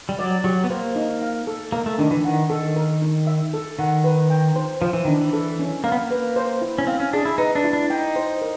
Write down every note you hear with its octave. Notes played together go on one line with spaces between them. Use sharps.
G3
F#3 D5
F#3 G4
B3
A#3 C5
D#4
F5
A4
A#3 A#4
A3
D#3 D4
E3
D#3 F#5
D#3 A4
A#4
D#4
E5
A4
D#3 F#5
B4
G5
C5
F3 C5
E3
D#3 D4
E3
A4
C#4
A#3 F5
B3
A#3
B4
C5
E4
C#4
C4 F5
C#4
D4 G#4
E4
D#4 B4
D4
E4
D4
D#4 G5
C5
A#4